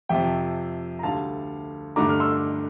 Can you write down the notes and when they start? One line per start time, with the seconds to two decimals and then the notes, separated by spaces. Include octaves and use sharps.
0.09 F2 C3 F3 E5 G5
0.99 A#5
1.03 D2 D3 G3 F5 A5
1.96 G2 D3 A3 D4 A#5 D6
2.10 F6
2.20 C6 E6